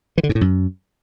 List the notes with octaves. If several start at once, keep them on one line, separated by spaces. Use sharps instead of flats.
E3
D3
G#2
A2
F#2